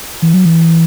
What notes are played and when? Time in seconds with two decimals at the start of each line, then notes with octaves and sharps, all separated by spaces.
0.22 E3
0.34 F#3
0.45 E3